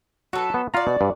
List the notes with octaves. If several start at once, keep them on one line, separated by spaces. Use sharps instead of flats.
F#3 F#4 A4 B4
B3
F4 F#4 D5 A#5
B2
G2